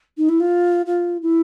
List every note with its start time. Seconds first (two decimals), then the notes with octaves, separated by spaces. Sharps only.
0.17 D#4
0.28 E4
0.40 F4
0.86 F4
1.22 E4